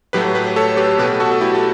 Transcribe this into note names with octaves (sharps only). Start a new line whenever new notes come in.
A2 F#3 A3 G4 B4
G4 B4
A4 C#5
G4 B4
B2 A3 G4 B4
F#4 A4
A4
E4 G4
A4